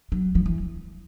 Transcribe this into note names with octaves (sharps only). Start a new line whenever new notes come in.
F#3
F3
E3